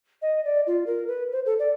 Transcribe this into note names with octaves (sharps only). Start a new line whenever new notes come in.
D#5
D5
F4
A#4
B4
C5
A4
D5